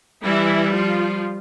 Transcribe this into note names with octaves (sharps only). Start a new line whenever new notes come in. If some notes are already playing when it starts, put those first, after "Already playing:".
E3 G3 E4
F3 F4